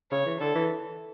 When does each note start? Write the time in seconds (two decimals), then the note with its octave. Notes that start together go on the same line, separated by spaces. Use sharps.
0.11 C#3 C#5
0.26 E3
0.40 D3 A4
0.55 E3